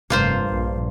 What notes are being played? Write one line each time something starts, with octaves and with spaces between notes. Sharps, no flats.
F1 D2 G2 A#3 F4 C5
A#1